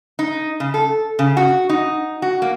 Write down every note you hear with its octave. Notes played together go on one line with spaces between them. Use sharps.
D#4
C#3
A4
C#3
F#4
D#4
F#4
A#3